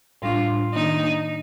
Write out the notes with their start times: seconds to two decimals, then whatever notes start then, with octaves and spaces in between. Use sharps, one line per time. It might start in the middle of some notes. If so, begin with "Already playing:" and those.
0.22 A2 G3 D4 F4
0.74 D#3 A#3 D4 D#4